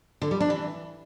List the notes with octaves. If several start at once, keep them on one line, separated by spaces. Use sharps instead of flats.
D3
G3
D4
E3